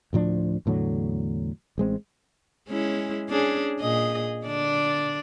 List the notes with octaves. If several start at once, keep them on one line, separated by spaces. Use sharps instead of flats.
D2 A2 F3 D4
E2 A2 D3 F#3
A1 G#3 C4
G#3 C#4 E4
C#4 D4 G#4
A#2 G#4 D#5
D3 D4 D5